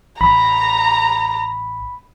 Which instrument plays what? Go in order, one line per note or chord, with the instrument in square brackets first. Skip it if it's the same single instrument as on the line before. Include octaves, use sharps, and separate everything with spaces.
[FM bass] A1 [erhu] A#5 [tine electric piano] B5